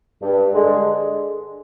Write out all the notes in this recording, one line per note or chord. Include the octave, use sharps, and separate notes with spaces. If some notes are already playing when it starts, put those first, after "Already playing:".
G2
D3 G#3